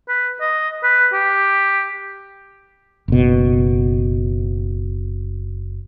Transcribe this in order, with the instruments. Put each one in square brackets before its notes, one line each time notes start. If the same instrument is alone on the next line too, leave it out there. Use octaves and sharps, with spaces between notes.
[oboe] B4
D#5
B4
G4
[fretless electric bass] F#1 B2